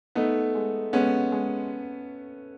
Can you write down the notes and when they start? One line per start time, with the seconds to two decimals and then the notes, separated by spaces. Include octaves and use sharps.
0.15 A3 B3 D#4
0.55 G#3
0.93 G#3 B3 C#4
1.32 G#3